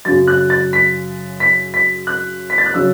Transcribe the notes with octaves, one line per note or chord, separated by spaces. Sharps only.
F#2 C#3 F#3 A6
F#6
A6
B6
B6
B6
F#6
B6
A6
F#6
C#3 F#3 E6